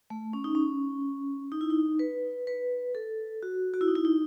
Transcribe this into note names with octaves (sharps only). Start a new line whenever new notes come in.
A3
C#4
D#4
C#4
D#4
E4
D#4
B4
B4
A4
F#4
F#4
E4
D#4
E4
D#4